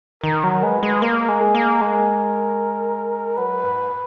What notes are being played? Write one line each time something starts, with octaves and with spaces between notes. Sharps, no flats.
D#3 A#4
F#3
G#3 B4
G#3
A#3 A#4
G#3
G#4
A#3
G#3 A#4
F#3 B4
G#2